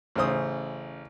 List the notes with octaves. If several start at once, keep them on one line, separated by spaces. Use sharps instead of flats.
A1 C#3 C5 D#6